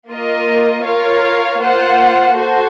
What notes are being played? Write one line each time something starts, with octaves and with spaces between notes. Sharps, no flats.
A#3 F4 A#4 D#5
F4 A#4 C#5 F5
A#3 F4 C5 F#5
F#4 A4 C5